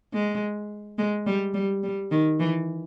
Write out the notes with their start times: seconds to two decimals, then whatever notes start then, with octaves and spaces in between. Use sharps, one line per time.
0.13 G#3
0.98 G#3
1.27 G3
1.54 G3
1.83 G3
2.11 D#3
2.40 E3